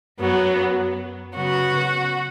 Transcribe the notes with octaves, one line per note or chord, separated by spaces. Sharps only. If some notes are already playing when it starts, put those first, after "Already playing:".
F#2 F#3 B3
C#3 F#3 B3 F#4